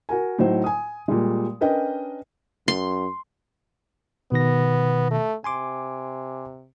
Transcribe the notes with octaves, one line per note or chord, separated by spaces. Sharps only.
F#4 A#4 G#5
A2 F#3 D#4 C5
G#5 D#6
A#2 G3 G#3
C#4 D4 A#4 B4 D#5 G5
F#2 C6
B2 D#3 B3 A#6
A3
C3 G#5 C6 D6